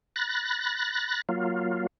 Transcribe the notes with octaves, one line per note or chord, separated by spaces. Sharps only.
B5 F#6 A6 A#6
F#3 A#3 F4